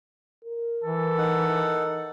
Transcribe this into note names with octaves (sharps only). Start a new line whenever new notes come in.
A#4
E3 A4
D#4 F#5